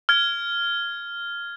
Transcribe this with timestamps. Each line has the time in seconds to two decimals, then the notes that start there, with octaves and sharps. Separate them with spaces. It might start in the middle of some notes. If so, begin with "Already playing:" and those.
0.09 F6 G#6